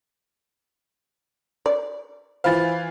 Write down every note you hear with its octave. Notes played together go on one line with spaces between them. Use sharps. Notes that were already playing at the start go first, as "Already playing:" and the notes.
D5
E3 F4 C5 F5 B5 A6